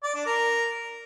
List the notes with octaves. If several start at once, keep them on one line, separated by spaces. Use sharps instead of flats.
D5
D4
A#4